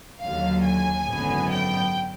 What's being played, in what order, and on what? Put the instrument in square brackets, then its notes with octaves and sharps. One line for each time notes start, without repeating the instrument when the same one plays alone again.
[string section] D#2 D3 F#3 F5
G#5
G#1 F#2 D3 F#3 B3
G5